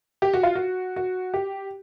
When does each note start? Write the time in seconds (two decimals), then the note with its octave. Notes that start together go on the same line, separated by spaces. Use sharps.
0.22 G4
0.34 F#4
0.43 F4
0.55 F#4
0.96 F#4
1.34 G4